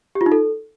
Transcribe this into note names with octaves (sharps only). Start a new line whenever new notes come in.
G4
F4
D#4
A4